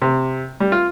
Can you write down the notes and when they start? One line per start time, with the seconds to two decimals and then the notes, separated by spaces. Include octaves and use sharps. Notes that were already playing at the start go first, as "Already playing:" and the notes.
0.02 C3
0.60 G3
0.72 F4